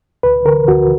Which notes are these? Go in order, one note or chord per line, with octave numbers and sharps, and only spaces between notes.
D2 B4
D3 A#4
D2 F#4